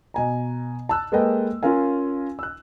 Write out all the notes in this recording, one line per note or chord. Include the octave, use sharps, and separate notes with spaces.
B2 G#5 A#5
A5 E6 F#6
G#3 A#3 A4 B4 D#5 G5
C#4 F4 A#4 F5 G#5
E6 F#6